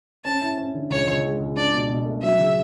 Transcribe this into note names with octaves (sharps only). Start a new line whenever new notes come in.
C#4 A5
E4
C#4
D3
C#2 C#5
C#2
G#3
C#2
D4 D5
B2
B2
A3
F#3 E5
C#3